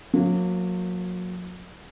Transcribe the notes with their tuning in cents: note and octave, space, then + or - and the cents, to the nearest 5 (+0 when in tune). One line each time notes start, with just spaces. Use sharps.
F#3 -35 A#3 -15